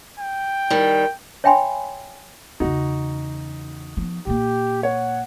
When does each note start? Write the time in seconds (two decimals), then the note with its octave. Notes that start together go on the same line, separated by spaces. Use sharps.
0.19 G5
0.70 D#3 G3
1.44 C#5 E5 G5 G#5 B5 C6
2.60 E2 C#3 D#4 F#4
3.97 F3 B3
4.27 A#2 A#3 G4
4.83 C#5 F#5